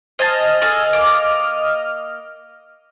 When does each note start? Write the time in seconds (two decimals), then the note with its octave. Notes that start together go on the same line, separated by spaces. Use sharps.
0.19 C5 D#5 G#5 A5 F6
0.62 G#4 A4 F5
0.93 A#3 D6